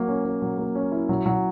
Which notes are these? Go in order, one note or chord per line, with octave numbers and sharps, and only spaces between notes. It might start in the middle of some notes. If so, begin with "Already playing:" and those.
Already playing: F#3 A#3
C#4
C#4
F#3
A#3
C#4
E4
F#3
F#3